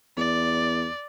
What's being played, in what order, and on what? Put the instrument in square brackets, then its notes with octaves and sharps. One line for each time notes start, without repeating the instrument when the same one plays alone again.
[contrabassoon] E2 [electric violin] D5